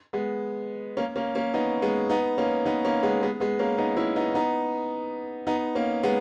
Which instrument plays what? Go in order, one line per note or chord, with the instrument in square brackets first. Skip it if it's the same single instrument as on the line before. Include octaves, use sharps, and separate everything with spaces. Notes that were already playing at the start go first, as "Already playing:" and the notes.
[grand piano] G#3 B3
A#3 C#4
A#3 C#4
A#3 C#4
B3 D#4
G#3 B3
B3 D#4
A#3 C#4
B3 D#4
A#3 C#4
G#3 B3
G#3 B3
G#3 B3
A#3 C#4
B3 D#4
C#4 E4
B3 D#4
B3 D#4
B3 D#4
A#3 C#4
G#3 B3